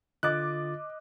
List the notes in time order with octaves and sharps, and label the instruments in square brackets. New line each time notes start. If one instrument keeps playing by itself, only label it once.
[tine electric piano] D3 F4 A6 [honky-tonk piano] D#5 D6 [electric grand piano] F#6